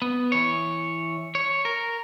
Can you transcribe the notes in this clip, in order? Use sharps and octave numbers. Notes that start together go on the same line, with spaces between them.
B3
E3 C#5
C#5
A#4